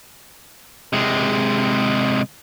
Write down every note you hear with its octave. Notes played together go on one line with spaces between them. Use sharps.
C3 G#3